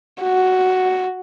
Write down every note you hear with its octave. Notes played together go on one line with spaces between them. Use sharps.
F#4